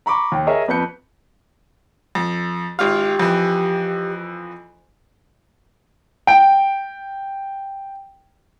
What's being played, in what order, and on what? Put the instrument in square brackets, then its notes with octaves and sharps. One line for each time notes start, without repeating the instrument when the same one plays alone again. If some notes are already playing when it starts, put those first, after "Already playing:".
[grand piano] A#5 B5 C#6 D6
D#2 G5
G#4 A#4 C#5 D#5 E5
F2 B4 G6 C#7
[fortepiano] F2
[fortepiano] G#1 F4 F5 [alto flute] G4
[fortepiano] F2 E3
[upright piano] G5 D7